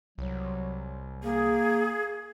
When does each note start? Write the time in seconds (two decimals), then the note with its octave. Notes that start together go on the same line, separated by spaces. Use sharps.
0.18 C2 F#3
1.23 A#3 G#4